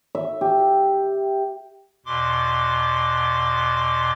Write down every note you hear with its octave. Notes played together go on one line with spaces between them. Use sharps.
E5
G4
E2 B2 C6 D6